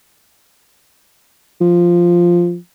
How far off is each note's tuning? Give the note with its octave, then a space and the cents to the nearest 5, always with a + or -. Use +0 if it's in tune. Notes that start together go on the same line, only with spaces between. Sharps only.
F3 -5